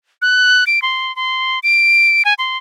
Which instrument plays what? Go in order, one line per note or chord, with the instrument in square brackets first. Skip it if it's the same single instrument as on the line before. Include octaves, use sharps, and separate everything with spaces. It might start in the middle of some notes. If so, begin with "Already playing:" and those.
[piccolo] F#6
D7
C6
C6
D7
G#5
C6